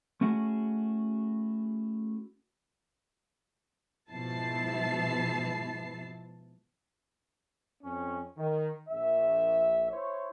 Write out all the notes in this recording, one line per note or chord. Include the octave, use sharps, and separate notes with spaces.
A3 C#4 E4 F#4 G#4
G#2 B2 F3 E4 A5 C7
F2 C#4
D#3
A#1 E5
E4 C5 C#5